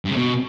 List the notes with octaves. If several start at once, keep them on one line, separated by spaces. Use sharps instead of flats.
G2
C#3
B2